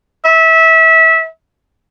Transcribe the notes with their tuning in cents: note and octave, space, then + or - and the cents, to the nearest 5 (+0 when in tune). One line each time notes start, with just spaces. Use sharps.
E5 -25